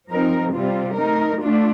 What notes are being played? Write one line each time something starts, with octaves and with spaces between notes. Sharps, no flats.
F3 C4 D#4 A#4
C3 G3 C4 F4
A3 D#4 A#4
A3 D4 F4